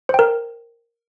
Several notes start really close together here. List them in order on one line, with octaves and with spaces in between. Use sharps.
C5 G5 A#4